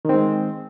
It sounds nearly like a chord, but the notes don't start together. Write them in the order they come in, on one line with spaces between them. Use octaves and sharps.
D#3 C4 G#3